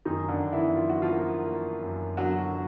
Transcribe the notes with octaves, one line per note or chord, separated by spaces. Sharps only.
F#2 D#3 D#4
D3 D4
F#2
E3 E4
F#3 F4
F#4
F3 F4
A#3
A#3
F#2
D3 F#3 F#4
F#3